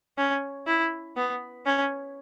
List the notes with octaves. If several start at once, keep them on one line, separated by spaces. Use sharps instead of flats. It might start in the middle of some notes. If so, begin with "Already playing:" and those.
C#4
E4
B3
C#4